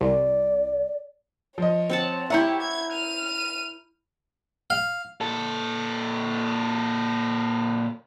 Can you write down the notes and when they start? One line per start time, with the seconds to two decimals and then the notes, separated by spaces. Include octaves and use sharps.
0.01 C2 D5
1.58 F3 C#5 D#5
1.90 C4 F#5 A5
2.30 E4 G4 C#5 E5 F#5 A#5 G6
2.62 G#6
2.92 F6 D#7
4.70 F5
5.21 A#2 A4